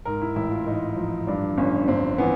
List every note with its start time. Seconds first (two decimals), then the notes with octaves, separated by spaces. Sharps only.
0.05 G#2 A#4
0.21 E4
0.36 A1 E4
0.51 F4
0.66 A1 D#4
0.97 F3
1.27 G2 D4
1.58 G1 C#4
1.88 G1 C4
2.18 E3 B3